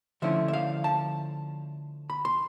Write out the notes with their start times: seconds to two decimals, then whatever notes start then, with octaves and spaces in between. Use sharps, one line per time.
0.22 D3 F3 A3 C#4 E4 E5
0.48 E5
0.53 F5
0.84 A5
2.10 B5
2.25 C6